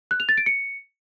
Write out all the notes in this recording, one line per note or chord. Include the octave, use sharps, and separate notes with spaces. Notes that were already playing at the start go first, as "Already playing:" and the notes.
F#6
F7
A6
D7
C#7